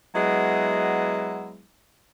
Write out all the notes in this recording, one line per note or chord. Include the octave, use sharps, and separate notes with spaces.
F#3 G#3 B3 E4